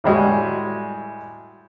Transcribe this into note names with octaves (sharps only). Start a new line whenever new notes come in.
A2 G3 G#3 F#4